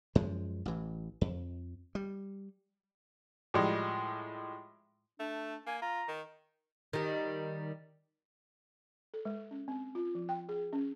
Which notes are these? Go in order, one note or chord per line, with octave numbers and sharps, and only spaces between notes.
F#2 F3 G#3
A1 E3
F2
G3
A2 F3 G3 G#3
A3 D4
A#3 G#5
F4 A#5
D#3
D#3 G3
A4
G#3
C#4
C4
F4
F3
G5
G#4
C#4